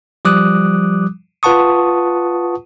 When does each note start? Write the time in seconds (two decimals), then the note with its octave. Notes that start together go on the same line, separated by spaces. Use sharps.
0.25 F3 G3 D6 D#6 F#6
1.43 F4 B4 F#5 A5 C#6 D#6